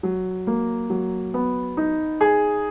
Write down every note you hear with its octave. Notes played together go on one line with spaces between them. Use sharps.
F#3
A#3
F#3
B3
D#4
G#4